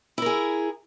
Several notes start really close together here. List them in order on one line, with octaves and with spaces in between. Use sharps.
E4 A#4 G#4